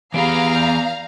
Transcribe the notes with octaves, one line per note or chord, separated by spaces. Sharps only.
E3 B3 G4 G#4 F5 A#5 B5 D7
D5 G6 F7